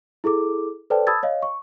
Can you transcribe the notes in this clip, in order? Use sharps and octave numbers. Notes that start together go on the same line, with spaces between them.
E4 G#4 A4 D6
A4 B4 C5 D5 G5 A5
A5 B5 D#6 E6 G#6 A6
C#5 D#5 F5
C#6